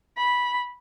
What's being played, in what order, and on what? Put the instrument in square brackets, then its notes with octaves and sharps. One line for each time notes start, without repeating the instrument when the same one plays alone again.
[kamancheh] B5